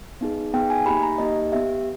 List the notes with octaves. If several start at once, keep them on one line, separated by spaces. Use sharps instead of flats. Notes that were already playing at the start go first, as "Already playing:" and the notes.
B3 D#4 G#4
B3 D#4 G#4 G5
G#5
A#3 D#4 G4 B5
A#5
A#3 D#4 G4 D#5
B3 G4 E5